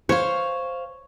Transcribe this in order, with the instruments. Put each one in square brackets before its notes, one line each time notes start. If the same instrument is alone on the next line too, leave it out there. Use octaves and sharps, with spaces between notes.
[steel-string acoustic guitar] C5 F5 [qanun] C#5